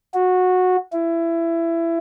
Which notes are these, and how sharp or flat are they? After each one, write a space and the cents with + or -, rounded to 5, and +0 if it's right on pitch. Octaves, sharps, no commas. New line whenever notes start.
F#4 -15
E4 +20